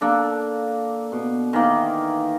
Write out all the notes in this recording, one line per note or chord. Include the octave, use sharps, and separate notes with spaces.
A#3 D4 A4
B2
D#3 E3 A#3